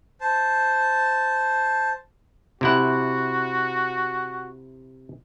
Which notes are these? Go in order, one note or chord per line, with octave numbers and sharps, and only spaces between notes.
C5 A5
C3 E4 F#4 F#5